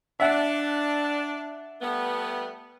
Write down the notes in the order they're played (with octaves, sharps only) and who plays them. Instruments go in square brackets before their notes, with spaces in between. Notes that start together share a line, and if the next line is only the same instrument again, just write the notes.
[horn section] D4 [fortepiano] E5 F#5
[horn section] G3 A3 B3